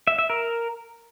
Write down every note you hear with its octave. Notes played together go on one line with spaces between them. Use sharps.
E5
E5
A#4